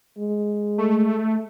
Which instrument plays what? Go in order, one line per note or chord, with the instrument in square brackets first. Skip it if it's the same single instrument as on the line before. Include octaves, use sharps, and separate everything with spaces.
[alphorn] G#3
[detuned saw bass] A3